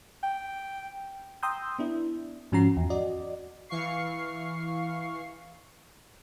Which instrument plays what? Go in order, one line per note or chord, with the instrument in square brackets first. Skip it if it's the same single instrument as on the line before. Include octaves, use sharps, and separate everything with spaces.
[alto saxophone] G5
[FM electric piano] G5 A#5 C6 D#6 E6 G6
B3 D4 E4
G#2 F3 C#4 F#4 A#5 C7
E2
F#4 D5 D#5
[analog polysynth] E3 F5 C#6 C7